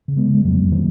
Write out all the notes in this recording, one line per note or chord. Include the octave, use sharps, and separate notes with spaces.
C#3
G#3 B3
C#3
G#3
F2 F#3 A#3
F2
D#3 F#3